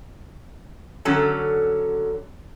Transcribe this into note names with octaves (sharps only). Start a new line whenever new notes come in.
D3 F#3 C#4 A4